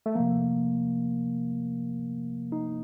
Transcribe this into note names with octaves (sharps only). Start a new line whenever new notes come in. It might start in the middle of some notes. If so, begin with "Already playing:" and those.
A3
C3 F3 A#3
D#4